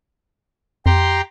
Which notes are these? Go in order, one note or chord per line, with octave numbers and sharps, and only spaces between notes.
F2 G4 A#5 C6